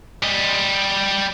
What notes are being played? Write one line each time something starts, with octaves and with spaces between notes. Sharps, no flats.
G3 D#5